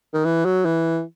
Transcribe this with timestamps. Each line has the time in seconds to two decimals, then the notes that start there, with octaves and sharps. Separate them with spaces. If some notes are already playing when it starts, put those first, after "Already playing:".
0.14 D#3
0.25 E3
0.45 F#3
0.65 E3